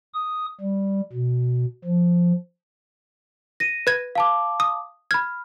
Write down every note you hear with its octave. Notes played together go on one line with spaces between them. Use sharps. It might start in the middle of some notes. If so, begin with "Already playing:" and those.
D#6
G3
B2
F3
A#6 D#7
B4 G#6
F5 A5 D6
D#6
B5 F6 G#6